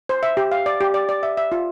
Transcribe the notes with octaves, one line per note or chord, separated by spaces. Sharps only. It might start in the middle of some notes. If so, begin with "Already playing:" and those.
C5
E5
G4
F5
D5
G4
D5
D5
E5
E5
F4